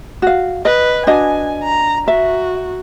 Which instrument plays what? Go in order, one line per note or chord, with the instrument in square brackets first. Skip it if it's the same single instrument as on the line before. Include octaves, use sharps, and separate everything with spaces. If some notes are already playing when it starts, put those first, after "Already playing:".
[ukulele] F#4 F5
[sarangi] B4 [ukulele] D#5
[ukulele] D4 F#4 D#5 [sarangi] G#5
[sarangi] A#5
[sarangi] F#4 [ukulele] E5